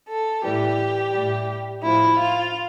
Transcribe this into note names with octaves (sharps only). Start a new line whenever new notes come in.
A4
A2 E3 G3 G4
A2 G3
A2 F3 E4
F4